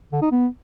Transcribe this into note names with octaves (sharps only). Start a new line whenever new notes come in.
D3
D#4
B3